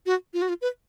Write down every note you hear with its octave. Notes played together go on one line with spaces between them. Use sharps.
F#4
F4
F#4
F4
B4